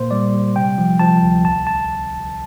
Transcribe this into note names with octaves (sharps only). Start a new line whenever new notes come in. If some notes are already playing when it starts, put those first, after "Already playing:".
Already playing: A#2 A#3 C5
G3 D5
G3
C3 G5
F3
F3 A5
D2
C2 A5
A5